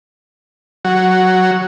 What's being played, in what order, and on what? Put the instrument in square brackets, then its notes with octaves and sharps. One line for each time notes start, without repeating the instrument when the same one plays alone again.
[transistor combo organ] F#3